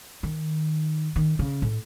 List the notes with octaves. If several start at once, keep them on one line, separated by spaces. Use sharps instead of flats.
D#3
D#3
C#3
A2